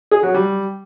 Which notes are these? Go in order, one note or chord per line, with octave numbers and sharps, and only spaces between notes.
G#4
F#3
G3